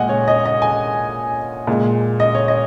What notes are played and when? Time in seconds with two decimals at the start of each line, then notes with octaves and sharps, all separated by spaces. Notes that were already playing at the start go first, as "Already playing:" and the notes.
Already playing: A#2 G#3 D#5 F#5 G#5
0.09 C#5
0.28 D#5
0.45 D#5
0.62 G#5
1.67 A#2 G#3
2.20 D#5
2.35 C#5
2.48 D#5